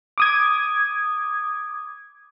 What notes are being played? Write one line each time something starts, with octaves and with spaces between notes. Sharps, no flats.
D6 D#6 G#6